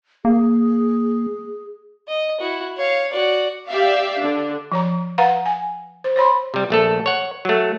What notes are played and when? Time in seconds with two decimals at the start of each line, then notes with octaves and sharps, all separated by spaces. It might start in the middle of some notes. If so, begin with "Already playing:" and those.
0.25 A#3 G#4
2.08 D#5
2.40 E4 F#4
2.77 C#5 F5
3.11 F#4 D5
3.68 G4 D5 E5 F5
4.19 D3 D4
4.72 F3 C#5 A#5
5.18 B4 F5 F#5 A#5
5.46 G#5
6.04 C5
6.16 C5 C#5 B5 C6
6.54 C3 G3
6.70 A#1 A3 A4
7.06 C#5 F#5
7.45 F#3 A3